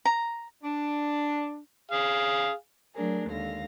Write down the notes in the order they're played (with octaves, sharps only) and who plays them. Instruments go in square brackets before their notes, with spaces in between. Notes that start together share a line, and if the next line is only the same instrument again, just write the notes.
[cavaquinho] A#5
[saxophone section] D4
[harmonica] G#4 F5
[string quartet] F#3 A3 D4 G#4 A#4
D#2 D3 G#3 F5 A#6